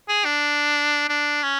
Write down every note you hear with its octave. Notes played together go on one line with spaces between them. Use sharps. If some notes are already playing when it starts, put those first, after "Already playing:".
G#4
D4
D4
C#4